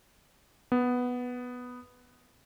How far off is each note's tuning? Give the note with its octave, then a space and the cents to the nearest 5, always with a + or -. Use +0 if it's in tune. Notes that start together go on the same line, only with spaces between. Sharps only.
B3 +0